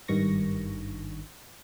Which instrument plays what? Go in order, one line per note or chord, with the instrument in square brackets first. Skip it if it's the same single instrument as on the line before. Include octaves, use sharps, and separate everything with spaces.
[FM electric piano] G#1 G2 D#3 C#6 A#6